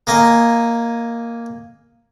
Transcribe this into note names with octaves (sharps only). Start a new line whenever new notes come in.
A#3 D#5 G#5